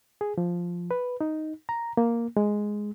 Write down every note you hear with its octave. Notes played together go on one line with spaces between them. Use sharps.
G#4
F3
B4
D#4
A#5
A#3
G#3